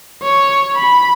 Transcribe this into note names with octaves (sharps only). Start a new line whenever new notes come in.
C#5
B5